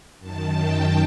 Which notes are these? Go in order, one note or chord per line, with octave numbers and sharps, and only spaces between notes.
F#2 D#3 A5
G5